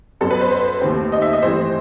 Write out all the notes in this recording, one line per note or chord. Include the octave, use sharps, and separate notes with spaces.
F#2 F#3 B3 A4
B4
C5
C5
D#2 D#3 A3 C4
D#5
E5
D#5
G2 E3 A3 C4 C5